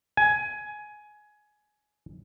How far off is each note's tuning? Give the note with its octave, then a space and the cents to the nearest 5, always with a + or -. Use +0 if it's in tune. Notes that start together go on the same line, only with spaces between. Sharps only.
G#5 +15